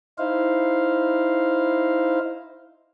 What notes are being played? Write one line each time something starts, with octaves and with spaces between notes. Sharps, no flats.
D#4 E4 C5 F5